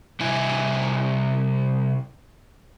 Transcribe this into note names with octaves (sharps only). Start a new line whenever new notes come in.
C3 G3 E4 E5 G#5